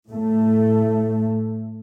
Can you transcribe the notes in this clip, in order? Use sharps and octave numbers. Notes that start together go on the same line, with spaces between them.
A2 A3